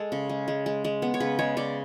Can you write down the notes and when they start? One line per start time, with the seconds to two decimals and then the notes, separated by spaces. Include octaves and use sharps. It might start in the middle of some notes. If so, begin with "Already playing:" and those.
Already playing: G#3 A4
0.12 C#3
0.29 G#3
0.48 G#3
0.66 G#3
0.84 G#3
1.02 B3
1.14 C#5
1.20 C#3 B4
1.39 G#3 C#5
1.57 C#3 D5